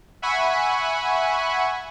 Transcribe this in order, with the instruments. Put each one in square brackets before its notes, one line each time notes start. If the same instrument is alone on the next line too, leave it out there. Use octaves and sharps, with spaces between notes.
[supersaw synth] E5 F#5 G#5 B5 C#6